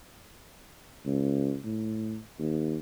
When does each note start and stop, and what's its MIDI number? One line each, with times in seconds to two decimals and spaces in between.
1.06 1.56 37
1.64 2.17 45
2.39 2.77 39